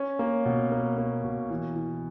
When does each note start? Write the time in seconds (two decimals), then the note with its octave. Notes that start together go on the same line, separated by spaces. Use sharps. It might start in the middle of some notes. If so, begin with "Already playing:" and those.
Already playing: C#4
0.19 A#3
0.45 B2
0.72 A#3
0.98 A#3
1.24 B2
1.50 E3
1.76 E3